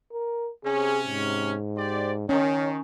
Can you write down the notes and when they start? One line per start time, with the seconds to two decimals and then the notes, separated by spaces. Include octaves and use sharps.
0.13 A#4
0.65 C3 C#4 G#4
1.07 G#2
1.76 G4 C5 D5
2.29 D#3 C#4 C#5